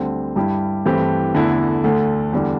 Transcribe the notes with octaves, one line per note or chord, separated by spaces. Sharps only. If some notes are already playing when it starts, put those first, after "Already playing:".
Already playing: D2 D3 G3 C4
G2 G3 E4 G4
G2 E3 A3 C4 G4
E2 D3 A3 E4
D2 D3 A3
E2 D3 G3 D4